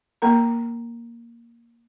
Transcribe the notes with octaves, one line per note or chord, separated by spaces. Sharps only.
A#3 A#4 A#5